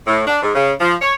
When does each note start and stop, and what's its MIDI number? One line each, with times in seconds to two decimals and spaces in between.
0.07 0.21 45
0.26 0.38 62
0.42 0.53 44
0.55 0.73 49
0.80 0.95 53
1.01 1.13 73